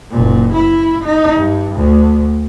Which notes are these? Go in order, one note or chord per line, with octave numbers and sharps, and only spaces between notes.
F#1 A#2
E4
D#4
G2
D2